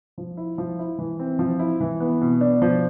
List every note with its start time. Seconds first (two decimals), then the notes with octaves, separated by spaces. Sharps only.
0.18 F3
0.37 E4
0.58 F3
0.79 E4
0.98 E3
1.19 C4
1.39 F3
1.59 E4
1.80 E3
2.00 B3
2.21 B2
2.41 D4
2.62 F3